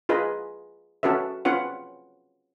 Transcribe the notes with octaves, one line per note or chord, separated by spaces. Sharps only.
F4 G#4 B4 D#5
C#4 F#4 A4 B4 E5
C4 C#4 F4 B4 F#5